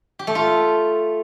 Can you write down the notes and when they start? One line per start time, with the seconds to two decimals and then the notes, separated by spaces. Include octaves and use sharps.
0.19 G4
0.27 A3
0.35 F4